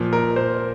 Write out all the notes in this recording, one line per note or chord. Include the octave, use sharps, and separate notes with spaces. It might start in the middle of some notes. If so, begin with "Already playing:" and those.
Already playing: A#2 F3
A#4
C5